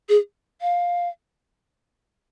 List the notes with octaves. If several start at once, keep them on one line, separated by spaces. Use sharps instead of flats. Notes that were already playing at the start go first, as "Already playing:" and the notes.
G#4
F5